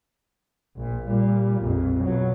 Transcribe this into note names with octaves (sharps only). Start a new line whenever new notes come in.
A#1 A#2
A#2 G3
A#1 F2
B2 F#3